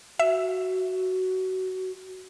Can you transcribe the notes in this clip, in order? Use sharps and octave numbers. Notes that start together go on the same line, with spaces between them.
F#4 E5